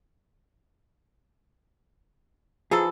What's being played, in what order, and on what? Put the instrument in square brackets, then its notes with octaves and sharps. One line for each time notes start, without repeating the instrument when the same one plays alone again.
[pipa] E3 D#4 A4 [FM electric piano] F3 [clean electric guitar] G#4